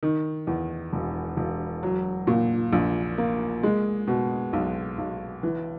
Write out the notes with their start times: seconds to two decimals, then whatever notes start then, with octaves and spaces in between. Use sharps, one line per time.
0.03 D#3
0.47 E2
0.93 E1
1.37 E1
1.83 F#3
2.27 A#2
2.72 A#1
3.18 A#3
3.63 G#3
4.07 B2
4.53 B1
4.98 B1
5.43 E3